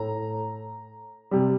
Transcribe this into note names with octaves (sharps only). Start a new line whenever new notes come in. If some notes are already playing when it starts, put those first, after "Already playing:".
Already playing: A2 A3 A#5
C3 G3